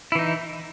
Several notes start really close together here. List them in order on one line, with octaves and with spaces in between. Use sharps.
E4 E3 D#4